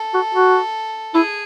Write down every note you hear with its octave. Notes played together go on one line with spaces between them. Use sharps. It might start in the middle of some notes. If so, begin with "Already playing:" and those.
Already playing: A4
F#4
F#4
E4 G#4